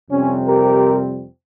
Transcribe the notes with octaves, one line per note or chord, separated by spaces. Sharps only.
F2 C3 G3 C4 C#4
G4 A#4